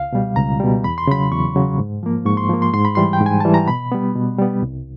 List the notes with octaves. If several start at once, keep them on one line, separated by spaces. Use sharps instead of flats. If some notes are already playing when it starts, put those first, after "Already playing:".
Already playing: C#2 F5
B2 G3
C#2 A#5
B2 G3
E2 B5
C6
C#3 F#3 B5
E2 C#6
C#3 F#3
G#2
F3 A#3
G#2 C#6
C6
F3 A#3
C6
G#2 C6
B5
E3 G3 C6
G5
G#2
G#5
E3 G3 A5
A#5
B2 B5
G3 B3
B2
G3 B3
C2